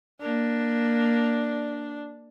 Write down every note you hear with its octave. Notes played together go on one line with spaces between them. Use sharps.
A#3 D4